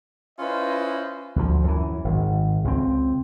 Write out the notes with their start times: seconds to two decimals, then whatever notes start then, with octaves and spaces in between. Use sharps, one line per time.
0.39 C#4 E4 F4 B4 C5 D#5
1.36 D2 F3
1.64 F#2 E3
2.04 G#1
2.64 C#2 C4